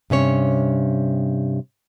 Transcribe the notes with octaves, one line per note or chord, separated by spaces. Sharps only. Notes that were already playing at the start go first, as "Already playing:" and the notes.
G2 C3 C#4 C#5